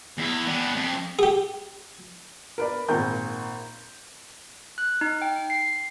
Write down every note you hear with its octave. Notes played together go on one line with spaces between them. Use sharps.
E2 E4
B3 D4
F2
G4 G#4
A#4 B4 D5
G#1 A#2 A#4 A#5 G6
F#6
D#4
G5
C7